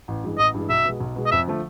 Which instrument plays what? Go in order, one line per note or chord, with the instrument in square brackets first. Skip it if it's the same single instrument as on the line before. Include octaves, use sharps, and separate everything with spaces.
[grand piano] A1
G2 E3 G#3
[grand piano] A1 [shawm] D#5
[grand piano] G2 E3 G#3
[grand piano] B1 [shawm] E5
[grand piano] B2 G#3
B1
B2 G#3
[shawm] D#5
[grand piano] F2 [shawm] E5
[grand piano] D3 F3 A3